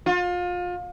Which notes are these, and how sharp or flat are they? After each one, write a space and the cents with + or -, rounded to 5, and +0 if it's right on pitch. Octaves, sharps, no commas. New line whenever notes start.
F4 +30